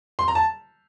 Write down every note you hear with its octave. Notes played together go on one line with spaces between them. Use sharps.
C6
A#5
A5